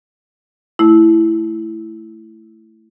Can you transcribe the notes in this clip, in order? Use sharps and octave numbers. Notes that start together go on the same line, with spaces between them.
A3 E4